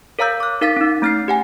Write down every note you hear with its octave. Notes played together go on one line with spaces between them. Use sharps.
A#4 C#5 F5 A#5 E6 G6
D6 F#6
D#4 A#4 F5 A6 B6
C#4 D#4
A3 C#4 F6 A6 C7
G4 F#5 G#5